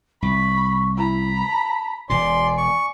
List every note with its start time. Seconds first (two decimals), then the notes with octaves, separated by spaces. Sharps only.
0.22 C2 B5 C#6
0.96 E4 A#5 B5
1.44 A5
2.10 E1 B2 D5 G#5 C6
2.58 C#6